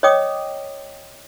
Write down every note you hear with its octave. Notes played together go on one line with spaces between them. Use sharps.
C#5 D#5 G5 D6 D#6